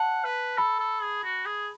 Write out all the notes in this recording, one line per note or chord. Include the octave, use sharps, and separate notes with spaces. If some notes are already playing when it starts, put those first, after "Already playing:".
Already playing: F#5 A5
B4
A4 B5
A4
G#4
F#4
G#4